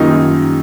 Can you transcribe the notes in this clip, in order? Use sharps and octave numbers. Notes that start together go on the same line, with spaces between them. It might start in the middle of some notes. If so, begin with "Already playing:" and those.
Already playing: F#2 D#3 G3 A#3 D#4 F4